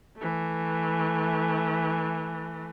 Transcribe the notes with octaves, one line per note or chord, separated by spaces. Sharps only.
E3 A3